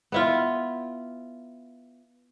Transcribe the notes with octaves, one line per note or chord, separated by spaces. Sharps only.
B3 E4 F4